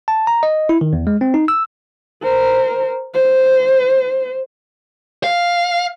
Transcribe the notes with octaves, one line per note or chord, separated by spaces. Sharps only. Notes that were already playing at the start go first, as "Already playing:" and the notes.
A5
A#5
D#5
E4
D#3
E2
G#3
C4
D#4
E6
A#4 C5
C5
F5